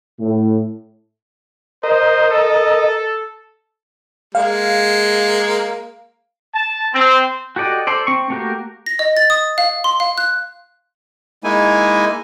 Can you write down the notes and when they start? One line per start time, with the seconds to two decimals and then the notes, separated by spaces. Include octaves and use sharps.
0.19 A2
1.83 A#4 C5 D#5
2.30 A4
4.35 G#3 A#3 F5
6.53 A5
6.93 C4
7.56 F#4 G4 A4 D5 D#5
7.87 A4 C5 D5
8.07 C4 C#6
8.30 A3 A#3 F#4 G4 A#4
8.86 A#6
8.99 D#5
9.17 A6
9.30 D#6
9.58 F5
9.84 C6
10.00 F5
10.18 F#6
11.44 G#3 A#3 D#4 E4 G#5